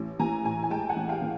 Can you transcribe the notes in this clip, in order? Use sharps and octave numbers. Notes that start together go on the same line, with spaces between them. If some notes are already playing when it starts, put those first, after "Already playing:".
Already playing: A1
E3 G#5 A#5
A2 G#5 A#5
G#5
G#3 G5 A5
F#5 G#5
A1
F5 G5
E3